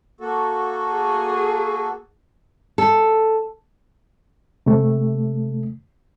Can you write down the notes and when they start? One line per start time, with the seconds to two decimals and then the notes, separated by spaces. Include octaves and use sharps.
0.21 A#3 F#4 A4
0.94 G#4
2.78 A4
4.66 C3 A3